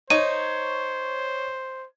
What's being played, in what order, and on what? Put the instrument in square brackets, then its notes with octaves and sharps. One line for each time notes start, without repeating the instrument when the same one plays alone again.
[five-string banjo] D#4 [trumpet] C5 [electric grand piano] C#5 [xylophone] D#7